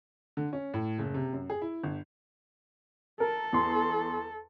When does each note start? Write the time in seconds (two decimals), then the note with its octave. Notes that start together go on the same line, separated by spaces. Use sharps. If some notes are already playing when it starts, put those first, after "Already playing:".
0.37 D3
0.53 C#4
0.74 A2
0.99 F#1
1.14 C3
1.33 F#2
1.50 G#4
1.62 E4
1.84 G1
3.20 A4 A#4
3.53 E2 C6